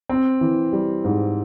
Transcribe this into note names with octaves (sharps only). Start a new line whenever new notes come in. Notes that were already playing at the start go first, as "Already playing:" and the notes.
C4
E3
G3
G#2